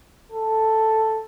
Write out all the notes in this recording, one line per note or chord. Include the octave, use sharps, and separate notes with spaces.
A4